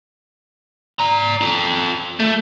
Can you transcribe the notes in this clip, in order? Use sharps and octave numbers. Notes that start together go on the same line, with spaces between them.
D5 A#5
F4 A4
A3